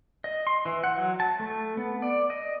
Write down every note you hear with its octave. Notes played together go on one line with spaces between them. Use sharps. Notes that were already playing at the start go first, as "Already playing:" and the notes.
D#5
C6
E3
F#5
F#3
A5
A3
B3
D5
D#5